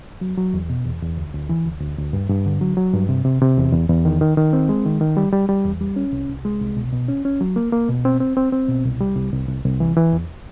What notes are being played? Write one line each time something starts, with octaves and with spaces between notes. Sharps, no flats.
F#3
F#3
E2
B2
E2
E2
D2
D2
E3
D2
D2
D2
G2
G2
D3
F#3
F#3
G2
C3
C3
C3
E2
E2
E2
D#3
D#3
D#3
C4
G#3
D#3
D#3
G3
G3
G3
E2
G3
C#4
C2
C2
G#3
C2
B2
B2
C#4
C#4
F#3
A#3
A#3
B2
C4
C4
C4
C4
B2
C2
G3
C2
C2
C2
C2
E3
E3
E2